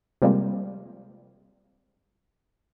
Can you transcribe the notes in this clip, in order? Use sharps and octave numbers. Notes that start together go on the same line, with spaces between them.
C3 F3 G3 G#3 A#3 C4